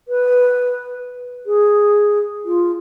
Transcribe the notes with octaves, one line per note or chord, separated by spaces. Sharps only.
B4
G#4
F4